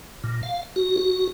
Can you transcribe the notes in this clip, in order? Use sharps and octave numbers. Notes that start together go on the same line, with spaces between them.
A#2
F5
F#4
F#4